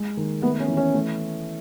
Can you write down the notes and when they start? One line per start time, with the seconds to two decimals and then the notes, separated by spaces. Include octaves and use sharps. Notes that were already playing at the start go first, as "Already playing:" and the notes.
Already playing: G#3
0.17 D#3
0.42 A3 B3
0.60 C#4
0.68 E3
0.77 C#4
0.94 A3